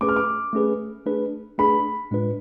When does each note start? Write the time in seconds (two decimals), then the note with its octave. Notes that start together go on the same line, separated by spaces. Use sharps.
0.01 A3 C#4 G#4 B4 D6
0.09 F6
0.16 D6
0.53 A3 C#4 G#4 B4
1.06 A3 D4 G#4 B4
1.58 A3 D4 G#4 B4 B5
2.11 A2 G#3 D4 F4 B4